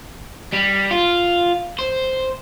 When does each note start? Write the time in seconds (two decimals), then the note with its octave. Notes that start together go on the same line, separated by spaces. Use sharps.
0.53 G3
0.91 F4
1.79 C5